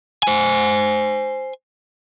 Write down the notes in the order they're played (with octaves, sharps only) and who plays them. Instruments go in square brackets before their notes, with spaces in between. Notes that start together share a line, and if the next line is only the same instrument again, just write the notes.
[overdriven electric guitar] C5 G#5